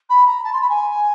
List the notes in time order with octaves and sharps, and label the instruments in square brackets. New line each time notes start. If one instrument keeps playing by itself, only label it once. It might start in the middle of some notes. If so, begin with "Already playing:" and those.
[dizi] B5
A#5
A5
C6
B5
G#5